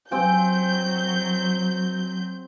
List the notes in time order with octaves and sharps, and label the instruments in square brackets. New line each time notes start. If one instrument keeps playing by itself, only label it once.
[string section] F#3 G6 [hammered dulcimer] C4 G5 G#5